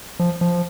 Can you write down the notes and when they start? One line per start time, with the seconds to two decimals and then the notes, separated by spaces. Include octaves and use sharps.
0.19 F3
0.41 F3